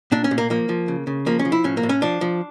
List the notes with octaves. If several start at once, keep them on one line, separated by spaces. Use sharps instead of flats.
A#2 D4
C#4
A#2
A#3
F3 A#3
F3
C#3
C#3
F3 A#3
C#4
F3
E4
A2 C#4
A#3
A2
C#4
F3 D4
F3